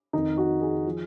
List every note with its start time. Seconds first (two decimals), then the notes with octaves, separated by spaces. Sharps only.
0.13 F2 D#3 D#4
0.37 F#4
0.61 G#4
0.87 F3